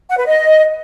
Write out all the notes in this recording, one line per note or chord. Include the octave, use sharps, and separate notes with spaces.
F#5
B4
D#5